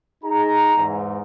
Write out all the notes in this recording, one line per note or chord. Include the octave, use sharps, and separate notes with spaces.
D#4 G#4 A#5
E2 G#2